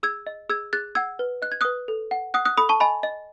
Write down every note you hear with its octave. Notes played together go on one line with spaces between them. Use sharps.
G#4 E6 G#6
D#5
G#4 E6 G#6
G#4 F#6 A6
F#5 E6 G#6
B4
D#5 F#6
G#6
B4 D#6 F#6
A4
F#5
F#5 D#6 F#6
D#6 F#6
A4 B5 D#6
A5 C#6
D#5 G#5 B5
D#5